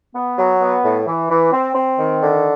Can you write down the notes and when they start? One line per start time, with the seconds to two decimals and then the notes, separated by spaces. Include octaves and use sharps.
0.15 B3
0.38 F#3
0.61 B3
0.83 A2
1.07 E3
1.29 E3
1.52 C4
1.75 C4
1.98 D#3
2.20 D3